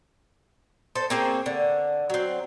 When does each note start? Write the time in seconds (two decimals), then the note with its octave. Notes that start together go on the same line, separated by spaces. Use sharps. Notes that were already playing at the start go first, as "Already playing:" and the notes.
0.95 A4 C5
1.10 A#3 C4 G#4 C#5
1.46 D3
2.10 F#3 C4